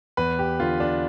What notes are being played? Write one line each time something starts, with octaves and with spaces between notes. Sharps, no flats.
E2 B4
G4
D3 F4
D4